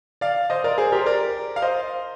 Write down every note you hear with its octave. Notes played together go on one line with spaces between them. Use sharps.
D5 F5
C5 D#5
A#4 D5
G#4 C5
G4 A#4
C5
A#4 D5
F5
C5 D#5